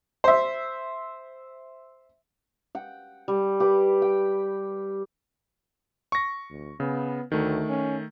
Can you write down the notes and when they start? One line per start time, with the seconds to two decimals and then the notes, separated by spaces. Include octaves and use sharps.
0.24 C5 E5
2.75 F#5 G5
3.28 G3
3.60 G4 B4
4.02 G5
6.12 C#6 A#6
6.50 D2
6.80 C#3 B3
7.32 D2 D#3 A3
7.69 C#4